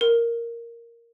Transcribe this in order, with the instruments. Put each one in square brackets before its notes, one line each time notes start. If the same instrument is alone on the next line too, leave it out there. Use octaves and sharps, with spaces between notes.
[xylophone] A#4